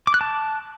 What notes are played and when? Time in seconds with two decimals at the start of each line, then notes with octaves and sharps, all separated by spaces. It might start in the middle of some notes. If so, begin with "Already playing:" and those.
0.07 D6
0.14 F#6
0.21 A5